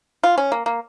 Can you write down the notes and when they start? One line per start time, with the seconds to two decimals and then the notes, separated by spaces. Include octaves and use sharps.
0.23 F4
0.38 C#4
0.52 A#3
0.66 A#3